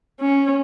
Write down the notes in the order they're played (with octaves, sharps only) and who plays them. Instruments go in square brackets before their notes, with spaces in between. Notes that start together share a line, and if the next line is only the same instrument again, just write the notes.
[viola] C#4